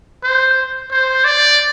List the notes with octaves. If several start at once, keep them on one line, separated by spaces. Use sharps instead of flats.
C5
C5
D5